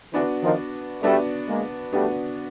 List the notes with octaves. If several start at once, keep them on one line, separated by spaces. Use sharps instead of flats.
D3 E3 B3 D4 F#4
D#3 F3
G3 A3 B3 D4 F#4
G#3 A#3
G3 A3 B3 D4 F#4